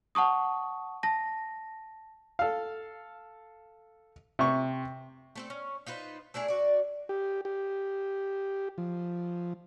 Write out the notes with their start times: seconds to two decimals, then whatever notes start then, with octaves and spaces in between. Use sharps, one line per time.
0.15 F#5 A5 C#6 D#6
1.03 A5 A#6
2.39 A4 F5
4.39 C3 C#6
5.35 A3 C4 A4
5.50 C#4
5.86 D#4 F4 B4 C5
6.34 A3 D4 E4 G#4
6.48 F#4 D5
7.09 G4
7.45 G4
8.78 F3